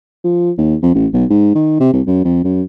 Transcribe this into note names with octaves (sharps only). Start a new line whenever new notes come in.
F3
D#2
F2
A1
B1
G#2
D#3
C3
C2
F#2
F2
F#2